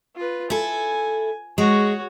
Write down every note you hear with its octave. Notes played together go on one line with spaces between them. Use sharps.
F4 B4
E4 A4 G#5
G#3 F#4 C#5